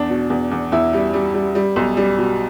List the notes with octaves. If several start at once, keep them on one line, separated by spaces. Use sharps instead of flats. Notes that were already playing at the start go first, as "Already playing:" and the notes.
Already playing: E2 D4
B2
E2
E2
E2 E4
G3
G3
G3
G3
B1
G3
B2